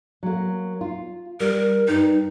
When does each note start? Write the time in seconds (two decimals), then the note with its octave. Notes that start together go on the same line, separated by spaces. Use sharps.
0.23 F#3 A#3
0.81 F4
1.40 G3 A#4
1.88 G2 D#4